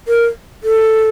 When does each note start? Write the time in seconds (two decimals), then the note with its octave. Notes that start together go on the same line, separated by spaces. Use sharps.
0.08 A#4
0.64 A4